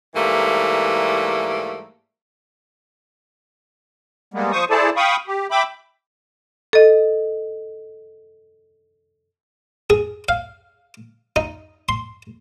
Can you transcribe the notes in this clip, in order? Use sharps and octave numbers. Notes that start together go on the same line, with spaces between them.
G#2 E3 G3 A3 A#3
G3 G#3 A#3 B3
F3 C5 C#6 D#6
E4 G#4 A4 C5 D5 A5
F5 G5 B5 C#6 D#6
G4
E5 G5 B5 D6
A4 D#5
G#4
F5
D#4
C6